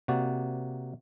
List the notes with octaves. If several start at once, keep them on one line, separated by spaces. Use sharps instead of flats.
C3 A#3 F#4 D5